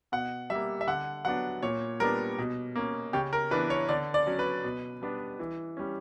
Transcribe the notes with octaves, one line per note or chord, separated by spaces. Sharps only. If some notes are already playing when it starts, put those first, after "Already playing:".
B2 F#5
G3 A#3 E5
E5
D3 F#5
F#3 B3 D4 F#5
A#2 C#5
G3 B3 D4 A#4
B2
A#3 C#4
C#3 G4
A#4
E3 B3 D4 B4
C#5
D3 D5
D5
F#3 C#4
B4
B2
G3 B3 D4
E3
G3 C#4